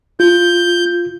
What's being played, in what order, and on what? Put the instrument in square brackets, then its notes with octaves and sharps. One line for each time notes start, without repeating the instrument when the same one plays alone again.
[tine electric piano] F4 [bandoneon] G6